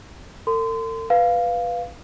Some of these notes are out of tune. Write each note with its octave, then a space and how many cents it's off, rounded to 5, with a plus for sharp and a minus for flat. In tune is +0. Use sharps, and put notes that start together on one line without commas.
A4 +45 C6 -30
B4 +0 F5 +0